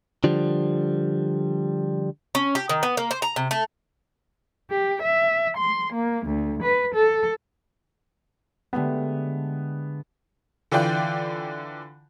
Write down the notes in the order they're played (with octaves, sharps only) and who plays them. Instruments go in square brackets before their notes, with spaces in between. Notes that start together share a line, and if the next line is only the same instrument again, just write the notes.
[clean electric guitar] D3 F3 G3
[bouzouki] C#4
G4
D#3
B3
A#3
C5
A#5
C3
A3
[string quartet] G4
E5
C6
A#3
D2
B4
A4
[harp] D3 G#3 A3 [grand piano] B3 G4
[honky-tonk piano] D3 E3 F4 D5 G5 F#6